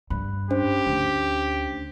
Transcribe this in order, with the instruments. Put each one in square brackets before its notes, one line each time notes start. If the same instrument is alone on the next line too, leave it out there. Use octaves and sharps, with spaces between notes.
[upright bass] G2 [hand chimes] B5 F#6
[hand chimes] C#4 D4 C5 [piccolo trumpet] G4
[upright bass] D2